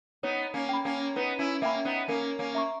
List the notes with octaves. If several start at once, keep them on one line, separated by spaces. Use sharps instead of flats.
B3 D#4 C#5
A#3 C#4
G5 B5
A#3 C#4
B3 D#4 B4
C#4 E4
A#3 C#4 E5 G5 B5
B3 D#4
A#3 C#4 A#4
A#3 C#4
E5 A#5 C#6